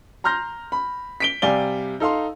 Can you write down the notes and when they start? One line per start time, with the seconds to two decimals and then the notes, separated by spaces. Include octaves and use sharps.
0.24 A#5 C6 F6 G6 A#6
0.72 B5
1.20 B6 D7 G7
1.42 C3 G3 D5 F5 G#5 G7
2.00 D#4 A4 F5 C6